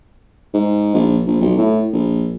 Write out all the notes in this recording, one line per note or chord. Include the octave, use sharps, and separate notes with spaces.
G#2
A#1
A#1
B1
A2
A#1